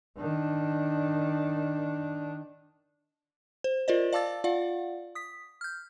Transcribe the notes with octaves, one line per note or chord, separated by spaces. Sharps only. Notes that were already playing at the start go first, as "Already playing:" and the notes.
D#3 D4
C5
F4 A#4 C5 D5 D#5
D5 F5 A5 D6 E6 A6
F4 D5 F5 F#5
D#6 B6
F6 G6